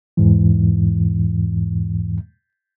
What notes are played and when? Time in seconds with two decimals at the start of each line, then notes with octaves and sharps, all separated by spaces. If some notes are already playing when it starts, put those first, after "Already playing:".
0.17 E2 G#2 E3